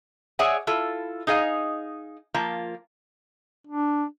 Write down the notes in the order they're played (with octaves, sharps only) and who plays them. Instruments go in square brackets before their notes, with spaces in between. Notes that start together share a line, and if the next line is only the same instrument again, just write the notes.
[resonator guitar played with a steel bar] G#4 C#5 D5 E5 F#5 G#5
E4 F4 A4
D#4 G#4 D#5 F5
F3 A#3 F4
[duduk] D4